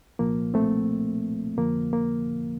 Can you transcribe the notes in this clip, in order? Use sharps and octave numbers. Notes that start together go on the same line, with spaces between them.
C2 A#2 F3 A#3
A3 C4
F2 D3 F3 A#3
A#3